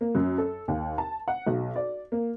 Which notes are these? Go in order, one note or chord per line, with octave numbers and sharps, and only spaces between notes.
A#3
F#2
A4
D#2
A5
F#5
B1
D5
A#3